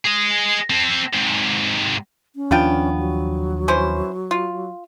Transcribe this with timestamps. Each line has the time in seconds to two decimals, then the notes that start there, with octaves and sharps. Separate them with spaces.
0.05 G#4 D#5
0.70 C4 A4
1.13 G#2 C3
2.36 C#4
2.51 D#2 F3 B3 D4 F4 G5
2.98 F#3
3.68 E3 C#4 C5
4.31 F4